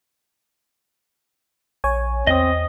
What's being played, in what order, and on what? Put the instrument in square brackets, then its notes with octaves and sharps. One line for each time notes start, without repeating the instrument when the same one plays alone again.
[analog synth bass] A#1 [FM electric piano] C#5 G#5
[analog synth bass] E2 [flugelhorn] C4 [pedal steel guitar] D#5 D#6